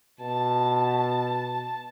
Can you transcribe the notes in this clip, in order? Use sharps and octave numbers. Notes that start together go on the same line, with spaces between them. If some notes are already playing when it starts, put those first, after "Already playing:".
B2 A5